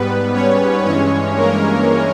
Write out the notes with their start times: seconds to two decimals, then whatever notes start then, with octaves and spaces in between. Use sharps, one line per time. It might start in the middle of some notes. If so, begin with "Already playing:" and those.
Already playing: G#2 G3 B3 B4
0.34 C#4 C#5
0.85 G2 E3 G#3 C#4 C#5
1.36 A#3 A#4